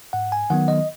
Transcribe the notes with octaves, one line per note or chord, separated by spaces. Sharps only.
G#2 F#5
G#5
D#3 F#3 B3 F#5
D#5